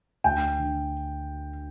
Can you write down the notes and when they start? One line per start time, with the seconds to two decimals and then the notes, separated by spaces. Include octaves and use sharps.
0.24 D2 G5
0.58 D3